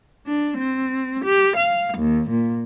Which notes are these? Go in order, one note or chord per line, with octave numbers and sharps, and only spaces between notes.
D4
C4
G4
F5
D#2
A#2